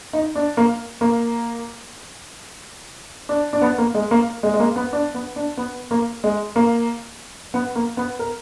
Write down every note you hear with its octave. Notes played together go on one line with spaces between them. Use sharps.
D#4
D4
A#3
A#3
D4
D4
B3
A#3
G#3
A#3
G#3
G#3
A#3
B3
D4
B3
D4
B3
A#3
G#3
A#3
B3
A#3
B3
A#4